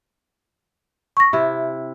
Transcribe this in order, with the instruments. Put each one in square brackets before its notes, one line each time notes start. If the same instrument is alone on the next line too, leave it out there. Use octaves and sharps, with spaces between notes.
[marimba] C#6 A#6
[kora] C3 E4